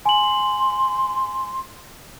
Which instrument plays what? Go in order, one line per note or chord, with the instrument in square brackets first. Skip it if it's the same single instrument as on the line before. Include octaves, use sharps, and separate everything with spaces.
[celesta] G#5 F#7 [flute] C6